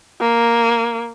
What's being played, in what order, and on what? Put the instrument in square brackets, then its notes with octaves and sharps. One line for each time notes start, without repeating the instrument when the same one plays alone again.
[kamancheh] A#3